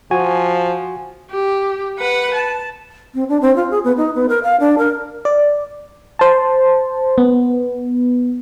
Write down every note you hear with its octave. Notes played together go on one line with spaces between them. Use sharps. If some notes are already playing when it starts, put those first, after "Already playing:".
F3 F#4 G#5
G4
B4 F#5
A5
C4
D4
C4
F4
G#4
B3
D#4
B3
A#4
F5
D4
A#4
D5
C5 A5
B3